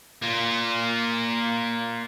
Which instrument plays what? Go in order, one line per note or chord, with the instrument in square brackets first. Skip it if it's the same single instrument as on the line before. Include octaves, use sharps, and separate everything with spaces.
[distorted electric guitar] A#3 F4